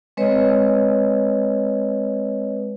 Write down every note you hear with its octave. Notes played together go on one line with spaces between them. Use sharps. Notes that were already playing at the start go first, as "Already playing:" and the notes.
G#3 C4 B4 C#5 D#5